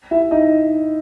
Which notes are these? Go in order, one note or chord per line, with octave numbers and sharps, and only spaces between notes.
E4 E5
D#4 D#5